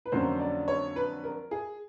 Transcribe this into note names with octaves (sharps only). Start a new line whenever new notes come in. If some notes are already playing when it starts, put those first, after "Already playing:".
B4
F2 D3 F#3 A#3 C#4 C5
D5
C#5
B4
A#4
G#4